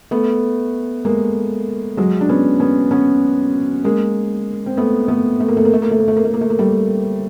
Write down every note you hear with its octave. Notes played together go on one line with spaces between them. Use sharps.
A3 B3
G#3 A#3
F#3 G#3
D4
B3 C#4
B3 C#4
B3 C#4
G#3 A#3
C4
A3 B3
A3 B3
A3
A#3
A3
A#3
A3
A#3
A3
A#3
A3
A#3
A3
A#3
A3
A#3
G3 A3